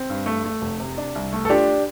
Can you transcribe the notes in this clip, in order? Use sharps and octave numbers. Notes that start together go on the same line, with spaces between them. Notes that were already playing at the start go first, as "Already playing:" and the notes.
Already playing: C4
G2
A3
A3
F1
C3
D4
C2
A3
A4
D4 F4 G4